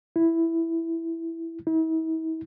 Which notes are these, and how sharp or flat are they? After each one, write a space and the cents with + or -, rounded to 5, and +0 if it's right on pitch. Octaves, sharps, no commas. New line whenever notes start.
E4 +0
E4 -45